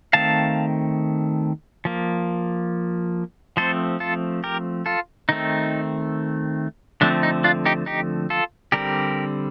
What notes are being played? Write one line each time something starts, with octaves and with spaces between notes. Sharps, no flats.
D#3 A3 C4 F5 A5
F3 A#3
F3 A3 C4 A4 C5
F4 A4
G4 A#4
F4 A4
D#3 A3 C4 D#4
D3 F3 A3 C4 D4
D#4
D4 F4
D#4 G4
D#4 G4
F4 A4
D3 G3 C4 G4 A#4